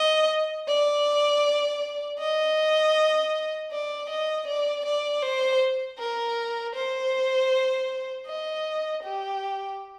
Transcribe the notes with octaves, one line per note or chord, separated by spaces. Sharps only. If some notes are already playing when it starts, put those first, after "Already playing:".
Already playing: D#5
D5
D#5
D5
D#5
D5
D5
C5
A#4
C5
D#5
G4